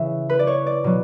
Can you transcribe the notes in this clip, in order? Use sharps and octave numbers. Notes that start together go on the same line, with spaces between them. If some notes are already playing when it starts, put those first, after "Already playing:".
Already playing: C#3 E3 E5
B4
D5
C#5
D5
B2 F#3